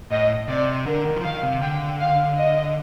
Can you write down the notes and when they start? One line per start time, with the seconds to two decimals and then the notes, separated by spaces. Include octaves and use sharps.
0.11 A2 D#5
0.48 C3 D5
0.86 D3 A#4
1.05 D#3
1.16 F3
1.24 D#3 F5
1.43 C3
1.61 D3 G5
2.00 F5
2.37 D#5